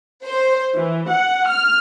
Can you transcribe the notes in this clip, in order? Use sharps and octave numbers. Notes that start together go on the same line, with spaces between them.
C5
E3
F#5
F6